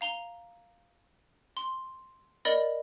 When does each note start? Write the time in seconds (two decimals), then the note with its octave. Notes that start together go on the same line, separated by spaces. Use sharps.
0.01 F5 A#5 G7
1.57 C6
2.45 A#4 D5 D#5 B5